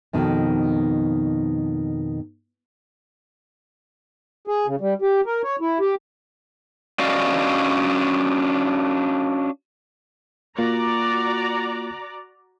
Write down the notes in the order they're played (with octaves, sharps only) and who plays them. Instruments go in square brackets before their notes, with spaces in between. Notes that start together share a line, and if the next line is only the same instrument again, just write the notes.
[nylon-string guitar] F2 B2 D#3
[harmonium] G#4
C#3
G3
G4
A#4
C#5
E4
G4
[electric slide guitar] C#4 D4 F#4 D5 D#5 F5
[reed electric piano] A#3 F4 [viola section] F#4 D5 A#5